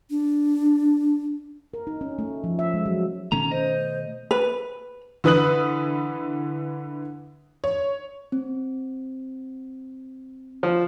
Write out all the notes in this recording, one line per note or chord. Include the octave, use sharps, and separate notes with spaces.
D4
A#4
D#4
C#4
A3
F3
E5
G#3
F#3
B2 D#3 A3 C#4 A#5
C5 D#5
B4
D3 E3 B4 D#6 F#6 F#7
C#5
C4
F3